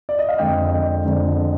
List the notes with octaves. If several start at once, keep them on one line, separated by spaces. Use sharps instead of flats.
D5
D#5
F5
F2 D3 G#3 D#5 G5
F2 D3 G#3